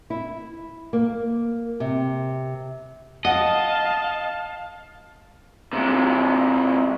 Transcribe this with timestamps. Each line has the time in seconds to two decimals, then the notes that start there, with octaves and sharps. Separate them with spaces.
0.10 E4
0.93 A#3
1.80 C3
3.25 D#5 F5 F#5 A5
5.73 C3 G#3